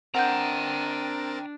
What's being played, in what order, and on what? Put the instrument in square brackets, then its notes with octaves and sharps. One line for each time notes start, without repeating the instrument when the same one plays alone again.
[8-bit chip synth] C4 A#4 A6 [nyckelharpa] D4 [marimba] F#5 G6 [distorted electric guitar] G5 A#5